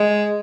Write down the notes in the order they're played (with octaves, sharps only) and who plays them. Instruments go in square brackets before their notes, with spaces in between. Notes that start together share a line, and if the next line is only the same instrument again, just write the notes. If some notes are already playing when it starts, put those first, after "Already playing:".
Already playing: [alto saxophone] G#3